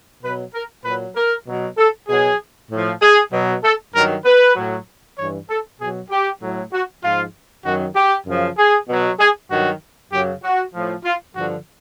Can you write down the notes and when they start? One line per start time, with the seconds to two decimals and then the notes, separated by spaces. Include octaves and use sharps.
0.23 B2 F#3 B4
0.54 A#4
0.85 A#2 F#3 B4
1.16 A#4
1.46 B2 F#3
1.78 A4
2.08 B2 F#3 G#4
2.70 A2 F3
3.02 G#4
3.32 B2 F#3
3.64 A4
3.94 G2 D#3 F#3 A#4
4.25 B4
4.56 A2 F#3
5.17 G2 E3 C#5
5.49 A4
5.80 B2 F#3 G#4
6.10 G4
6.41 A2 F#3
6.73 F#4
7.03 G#2 F3 F4
7.65 F#2 D#3 F#3 F#4
7.95 G4
8.27 F#2 C#3 F3
8.58 G#4
8.88 B2 F#3
9.19 G#4
9.50 G2 D#3 F#3 F#4
10.12 F#2 C#3 F#3 G4
10.43 F#4
10.74 A2 F3
11.05 F4
11.35 G2 D3 F3 F#4